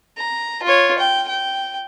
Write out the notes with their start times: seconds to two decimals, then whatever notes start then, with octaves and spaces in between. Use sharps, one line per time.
0.18 A#5
0.63 F4 C#5
0.98 G5
1.29 G5